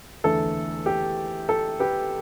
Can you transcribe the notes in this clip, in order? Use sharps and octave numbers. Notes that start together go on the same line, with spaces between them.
E2 D3 A3 A4
G4
A4
G4 B4